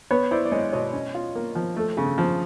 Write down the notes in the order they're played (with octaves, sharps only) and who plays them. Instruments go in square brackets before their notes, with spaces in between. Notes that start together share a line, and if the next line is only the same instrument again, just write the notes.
[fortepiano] B3 B4 C#5
E4 C5 D5
D5
G#3 C#5 D#5
B2 C#5 D#5
C#4
F4
A#3
F3
A3
C#3
F3